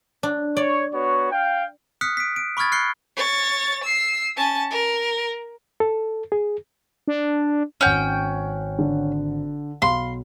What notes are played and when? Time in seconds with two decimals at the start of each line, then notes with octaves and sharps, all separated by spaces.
0.23 D4
0.57 C#5 D5
0.93 B3 F#4 C#5
1.31 F5 G5
2.01 D#6 F6 F#6 B6 C#7
2.17 B6 D7
2.36 D7
2.57 B5 C#6 D#6 F6 G#6 A6
2.72 F6 F#6 C7 C#7 G7
3.16 C#5 A6
3.83 E6 C7
4.37 C#4 A5
4.70 A#4
5.80 A4
6.32 G#4
7.08 D4
7.81 G#1 C#4 F#5 G5 F#6
8.79 D3
9.82 B1 F5 B5 C6